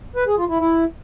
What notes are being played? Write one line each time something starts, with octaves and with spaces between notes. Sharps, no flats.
B4
G#4
F4
E4
E4